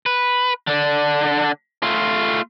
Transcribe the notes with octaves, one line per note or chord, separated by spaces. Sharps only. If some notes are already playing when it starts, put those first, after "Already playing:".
B4
D3 D4
A3 F4